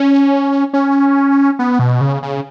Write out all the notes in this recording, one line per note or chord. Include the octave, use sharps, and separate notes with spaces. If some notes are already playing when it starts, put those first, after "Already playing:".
Already playing: C#4
C#4
B3
B2
C#3
C#3